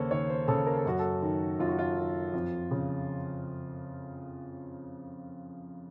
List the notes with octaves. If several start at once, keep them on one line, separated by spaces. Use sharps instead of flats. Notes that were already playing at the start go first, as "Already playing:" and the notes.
Already playing: D#2 C#3 A#3 A4 C5 C#5
D#2 C#5
C5
C#3 A4
A#4
A4
F#2 F#4
A4
D#3
F#2 F4
F#4
F4
D#3
F2
C#3